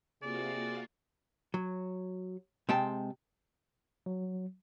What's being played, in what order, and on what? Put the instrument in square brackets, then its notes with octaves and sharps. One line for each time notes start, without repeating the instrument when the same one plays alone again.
[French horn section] C3 [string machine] A#3 F4 F#4 [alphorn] G#4 [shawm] D5
[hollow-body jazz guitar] F#3
C3 G#3 G5 A5
[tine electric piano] F#3